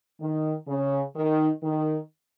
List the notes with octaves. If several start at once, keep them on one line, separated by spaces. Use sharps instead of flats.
D#3
C#3
D#3
D#3